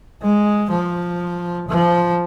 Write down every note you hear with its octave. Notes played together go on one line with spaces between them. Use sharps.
G#3
F3
F3